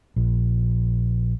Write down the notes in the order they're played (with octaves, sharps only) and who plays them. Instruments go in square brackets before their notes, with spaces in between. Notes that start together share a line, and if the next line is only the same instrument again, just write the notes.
[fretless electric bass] A#1